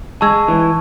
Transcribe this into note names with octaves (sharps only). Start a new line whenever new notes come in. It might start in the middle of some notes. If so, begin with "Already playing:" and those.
G#3 A5 C#6 E6 G#6
E3